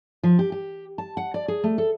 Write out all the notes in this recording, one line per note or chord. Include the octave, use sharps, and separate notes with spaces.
F3
G4
G4
A5
F#5
D5
G#4
A3
A4